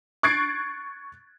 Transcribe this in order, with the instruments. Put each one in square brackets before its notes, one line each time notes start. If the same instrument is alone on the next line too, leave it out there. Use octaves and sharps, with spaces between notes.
[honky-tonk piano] C#6 F#6 G#6 A6 C7 D7